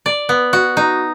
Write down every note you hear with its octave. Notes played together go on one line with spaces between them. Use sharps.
D5
B3
F#4
D#4